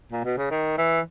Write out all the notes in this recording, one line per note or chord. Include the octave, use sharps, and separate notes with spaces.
A#2
B2
C#3
D#3
E3